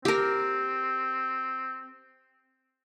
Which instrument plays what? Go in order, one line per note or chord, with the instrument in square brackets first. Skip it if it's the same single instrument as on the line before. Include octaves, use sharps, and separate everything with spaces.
[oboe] C4 [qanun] G4 A#4